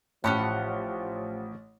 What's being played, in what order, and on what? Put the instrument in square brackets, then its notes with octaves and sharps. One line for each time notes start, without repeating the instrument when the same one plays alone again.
[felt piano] A1 [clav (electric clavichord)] A2 [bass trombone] F3 [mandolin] C#4 G4 F#5